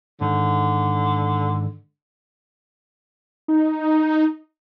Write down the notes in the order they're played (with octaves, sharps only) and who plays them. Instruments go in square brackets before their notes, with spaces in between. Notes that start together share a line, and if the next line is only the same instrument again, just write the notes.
[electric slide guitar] G#2 D#3 [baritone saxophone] D3
[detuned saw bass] D#4